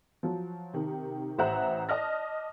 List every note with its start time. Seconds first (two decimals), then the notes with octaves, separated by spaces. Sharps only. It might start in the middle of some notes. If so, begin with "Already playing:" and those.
0.23 F3 F#3
0.74 C3 D#3
1.38 A1 C5 E5 F#5 A#5 F#6
1.89 D5 D#5 A5 F6 A#6